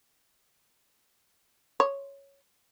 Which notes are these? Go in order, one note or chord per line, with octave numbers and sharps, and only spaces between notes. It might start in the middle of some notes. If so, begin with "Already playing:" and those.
C#5